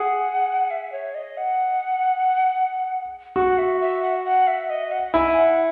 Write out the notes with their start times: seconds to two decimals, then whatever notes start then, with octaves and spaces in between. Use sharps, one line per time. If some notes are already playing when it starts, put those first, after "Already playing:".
Already playing: G#4 F#5
0.71 E5
0.92 C#5
1.15 D#5
1.37 F#5
3.36 F#4 F#5
3.58 E5
3.81 E5
4.02 F#5
4.25 F#5
4.47 E5
4.70 D#5
4.91 F#5
5.14 E4 G#5
5.36 F#5